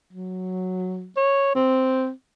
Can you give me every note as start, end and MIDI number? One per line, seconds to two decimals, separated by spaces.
0.13 1.09 54
1.16 1.54 73
1.55 2.10 60